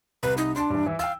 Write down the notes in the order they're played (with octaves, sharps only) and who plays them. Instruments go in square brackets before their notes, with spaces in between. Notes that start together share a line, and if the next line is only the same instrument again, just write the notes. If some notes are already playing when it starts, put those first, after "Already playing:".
[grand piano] C2 [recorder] B4
[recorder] D#4
[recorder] D4 [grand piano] A5 C6
[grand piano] G2 E3
E3 E4
[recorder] F5 [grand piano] G5 E6